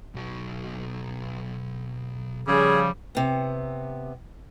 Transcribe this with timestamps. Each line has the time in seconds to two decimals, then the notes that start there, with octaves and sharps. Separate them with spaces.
0.15 B1 F#4
2.47 C#3 F3 G3 G#4 C6
3.15 C3 B3